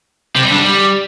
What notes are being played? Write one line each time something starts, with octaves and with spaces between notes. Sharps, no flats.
C3
G3
D3
G3